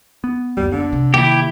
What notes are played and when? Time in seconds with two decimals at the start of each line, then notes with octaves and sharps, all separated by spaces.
0.24 B3
0.57 F#1 D2 G3
0.72 D3
0.92 C3
1.14 D#3 E3 A#3 E4 G4 G5